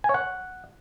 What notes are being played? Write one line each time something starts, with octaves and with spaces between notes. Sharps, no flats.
G#5
C#5
F#5